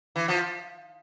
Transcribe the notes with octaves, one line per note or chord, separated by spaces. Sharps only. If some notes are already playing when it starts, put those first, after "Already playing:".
E3
F3